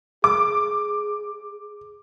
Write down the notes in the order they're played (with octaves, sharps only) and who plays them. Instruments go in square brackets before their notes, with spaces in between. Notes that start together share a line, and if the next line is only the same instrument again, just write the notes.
[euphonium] G#4 [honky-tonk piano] D6